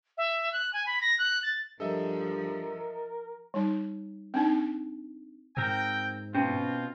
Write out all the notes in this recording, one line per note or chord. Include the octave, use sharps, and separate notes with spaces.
E5
F#6
G#5
B5
A#6
F#6
A6
G2 F3 A4 A#4 D#5 E5
G3 D#4
C4 D4 D#4
G#2 C4 A#4 G5
B2 C4 C#4 F4